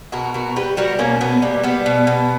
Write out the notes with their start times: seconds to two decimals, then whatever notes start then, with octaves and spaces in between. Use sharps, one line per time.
0.12 B2 F#4 A#4
0.34 B2 F#4 A#4
0.56 G3 G4 B4
0.77 G3 F#4 A#4
0.99 B2 A#3 C#4
1.21 B2 B3
1.42 G3 A#3
1.63 G3 B3
1.86 B2
2.07 B2